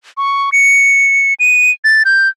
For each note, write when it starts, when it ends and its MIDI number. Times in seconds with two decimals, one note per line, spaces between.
0.17 0.50 85
0.52 1.34 97
1.40 1.70 99
1.84 2.03 93
2.05 2.29 91